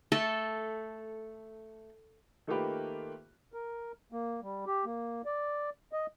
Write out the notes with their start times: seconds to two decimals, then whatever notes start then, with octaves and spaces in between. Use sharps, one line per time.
0.12 A3 A4
2.47 D#3 A3 A#3 F4 G4 B4
3.53 A#4
4.12 A#3
4.42 G3
4.67 G4
4.85 A#3
5.26 D5
5.93 D#5